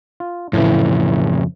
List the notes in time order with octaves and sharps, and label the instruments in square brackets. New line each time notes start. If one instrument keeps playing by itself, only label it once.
[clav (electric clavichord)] F4
[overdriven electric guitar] F2 C#3 [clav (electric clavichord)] A2 E3